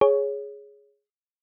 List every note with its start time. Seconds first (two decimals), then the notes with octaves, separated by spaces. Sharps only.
0.01 G#4 C#5